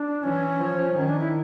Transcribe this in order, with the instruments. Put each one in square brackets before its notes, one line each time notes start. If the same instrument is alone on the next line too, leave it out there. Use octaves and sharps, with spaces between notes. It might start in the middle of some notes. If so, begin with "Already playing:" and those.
Already playing: [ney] D4
[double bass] E3 [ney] C#4
[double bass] F3
D#3
[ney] D4
E4